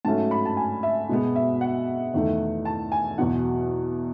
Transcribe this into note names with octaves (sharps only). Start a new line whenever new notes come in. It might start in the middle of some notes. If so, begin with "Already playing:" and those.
G#2 F#3 A3 C#4 A5
B5
A5
G#5
E5
B2 G#3 B3
E5
F#5
E2 D#3 A3
A5
G#5
E2 B2 F#3 F#5